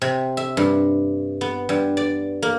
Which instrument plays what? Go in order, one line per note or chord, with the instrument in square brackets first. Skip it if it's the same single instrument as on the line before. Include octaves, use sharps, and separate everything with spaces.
[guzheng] C3
E5
G2
B3
G2
D5
A#3